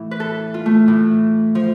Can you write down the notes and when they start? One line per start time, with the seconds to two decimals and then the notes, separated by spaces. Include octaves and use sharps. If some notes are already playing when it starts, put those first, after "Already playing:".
Already playing: A2 E3
0.11 B4
0.20 A4
0.54 F4
0.66 A3
0.88 A2 E3
1.55 F3